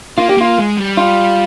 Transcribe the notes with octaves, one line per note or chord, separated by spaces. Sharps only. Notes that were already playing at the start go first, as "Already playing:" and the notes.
A#3 F4
G4
A#3 F4
G#3
G3
F4